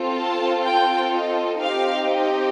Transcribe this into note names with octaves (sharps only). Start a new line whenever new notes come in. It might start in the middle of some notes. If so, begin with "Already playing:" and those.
Already playing: C4 F4 A4
A5
G5
D#5
C4 D#4 G4 F5
D#5